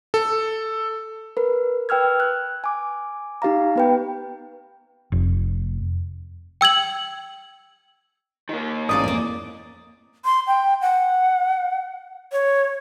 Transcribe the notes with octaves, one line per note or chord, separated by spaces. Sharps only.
A4
A#4 B4
B4 G5 E6 F6 G#6
F#6
G#5 D6
D#4 G4 F5 A#5
B3 B4 G5
F1
G5 E6 G#6 F#7
D#3 A#3
A1 D2 G#2 A#3 C#4 D5 F5 D#6
F2 G#3 A#3
C6
G5
F#5
C#5